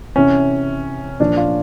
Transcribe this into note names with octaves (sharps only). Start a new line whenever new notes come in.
C3 E3 C#4
A#2 F3 D4
F4